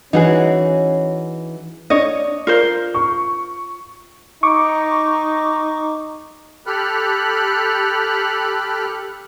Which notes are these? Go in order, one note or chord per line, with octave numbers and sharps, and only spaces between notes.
E3 C#4 D#4 F#4 G#4 F#5
D4 C#5 D#5
F4 A#4 C5
C#6
D#4 C#6 D6
G4 A4 B5 F6 F#6